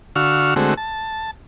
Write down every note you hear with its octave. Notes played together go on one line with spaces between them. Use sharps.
D3 F#4 F5 C#6 E6 F6
D3 G#3 A3 C4 F#4
A5